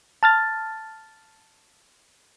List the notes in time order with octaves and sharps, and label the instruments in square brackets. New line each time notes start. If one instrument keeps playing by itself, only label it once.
[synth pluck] A5 F6 A6